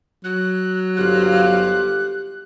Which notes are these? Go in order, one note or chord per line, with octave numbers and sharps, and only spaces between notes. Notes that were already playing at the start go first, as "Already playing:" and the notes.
F#3 F#6
G1 G4 C5 F5 F#6